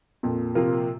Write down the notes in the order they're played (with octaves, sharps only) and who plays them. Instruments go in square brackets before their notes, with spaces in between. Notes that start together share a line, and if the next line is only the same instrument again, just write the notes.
[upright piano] F2 [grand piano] A#2
[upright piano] C3 F3 A#3 F4